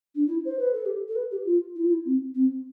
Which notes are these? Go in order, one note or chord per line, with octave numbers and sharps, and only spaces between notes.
D4
E4
C5
B4
A4
G4
A4
B4
G4
F4
E4
F4
E4
C4
C4